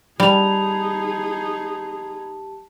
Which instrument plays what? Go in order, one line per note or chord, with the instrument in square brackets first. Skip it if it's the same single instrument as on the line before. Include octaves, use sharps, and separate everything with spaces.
[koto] G3 [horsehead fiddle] D#4 G#4 [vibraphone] G4 A5 [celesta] B5 F7